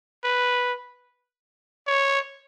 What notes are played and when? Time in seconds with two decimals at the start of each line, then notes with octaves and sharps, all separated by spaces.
0.24 B4
1.87 C#5